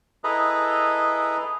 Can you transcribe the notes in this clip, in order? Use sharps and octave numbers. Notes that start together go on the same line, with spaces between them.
E4 G#4 A4 B4 D#5 A#5